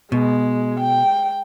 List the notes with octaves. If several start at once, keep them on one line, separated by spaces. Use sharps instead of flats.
B2 G#3
G5